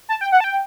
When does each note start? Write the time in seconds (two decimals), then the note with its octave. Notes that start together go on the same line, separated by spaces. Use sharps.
0.09 A5
0.21 G5
0.32 F#5
0.40 A5
0.44 G5